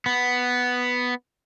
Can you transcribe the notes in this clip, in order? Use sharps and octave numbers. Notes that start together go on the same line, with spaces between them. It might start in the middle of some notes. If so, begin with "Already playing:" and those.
B3